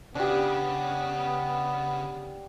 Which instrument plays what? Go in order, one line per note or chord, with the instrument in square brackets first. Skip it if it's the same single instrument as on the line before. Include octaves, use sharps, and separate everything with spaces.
[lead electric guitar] C#3 [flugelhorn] B3 [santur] D4 G4